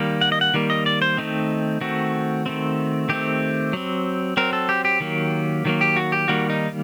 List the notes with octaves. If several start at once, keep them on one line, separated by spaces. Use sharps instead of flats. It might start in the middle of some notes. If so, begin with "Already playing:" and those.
Already playing: D#3 G3 A#3
F#5
D#5
F#5
D#3 G3 A#3
D#5
D5
C5
D#3 A3 C4 D#4
D#3 A3 C4 F#4
D#3 A3 C4
D#3 A3 C4 G4
F#3 C4
F#3 C4 A#4
A4
G4
G4
D#3 F#3 A#3
D#3 F#3 A#3
G4
F#4
G4
D#3 G3 A#3 F#4
D#4